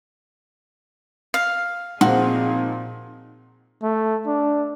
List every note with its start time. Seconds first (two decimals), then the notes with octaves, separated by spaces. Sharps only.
1.34 F5
2.01 A#2 F3 C4 D#4 F#4 G#4
3.83 A3
4.27 D4